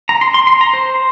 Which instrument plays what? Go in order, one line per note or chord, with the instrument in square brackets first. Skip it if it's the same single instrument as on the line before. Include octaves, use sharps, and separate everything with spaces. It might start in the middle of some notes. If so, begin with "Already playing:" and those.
[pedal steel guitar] A#5
C6
C6
C6
A#5
C5